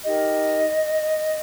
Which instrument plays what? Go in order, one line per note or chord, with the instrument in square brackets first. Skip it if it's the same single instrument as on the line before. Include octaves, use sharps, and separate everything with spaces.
[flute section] D#4 G4 A#4 D#5